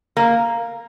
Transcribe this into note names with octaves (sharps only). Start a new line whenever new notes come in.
A#3